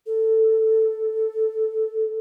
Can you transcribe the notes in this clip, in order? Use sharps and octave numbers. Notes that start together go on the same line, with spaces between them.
A4